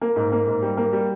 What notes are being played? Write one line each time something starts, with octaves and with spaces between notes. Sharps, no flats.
A#3
G#2
A#3
G#2
G3
A#3
G3